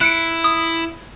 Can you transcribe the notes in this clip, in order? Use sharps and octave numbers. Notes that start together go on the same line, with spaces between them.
E4 F#6 C#7 D7
D#6